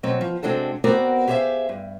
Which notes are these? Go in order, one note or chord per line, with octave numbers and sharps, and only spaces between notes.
B2 F#3 C4
F3
C3 G#3 C4 D4 F#4 A4
B3 C4 F#4 A#4 D5
G4 G#4 C5 D5 E5 F5
G2